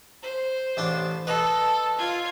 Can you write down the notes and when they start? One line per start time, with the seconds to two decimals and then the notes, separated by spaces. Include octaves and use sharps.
0.23 C5
0.77 A1 D4
1.27 A4 B4 D#5
1.98 F4 G#6